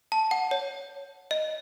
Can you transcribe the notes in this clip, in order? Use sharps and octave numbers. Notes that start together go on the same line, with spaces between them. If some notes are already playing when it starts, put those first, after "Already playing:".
A5
F#5
C#5
D#5